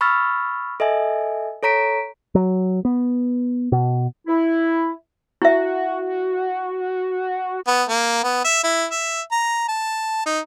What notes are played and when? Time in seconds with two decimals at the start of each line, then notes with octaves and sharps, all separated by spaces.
0.01 B5 C#6 E6 F6 A6
0.80 A4 D#5 E5 G#5
1.63 A4 C#5 A#5 B6 D7
2.35 F#3
2.85 B3
3.72 B2
4.27 E4
5.42 E4 F#4 E5
7.67 B3
7.89 A#3
8.23 B3
8.44 E5
8.64 E4
8.91 E5
9.31 A#5
9.68 A5
10.26 D#4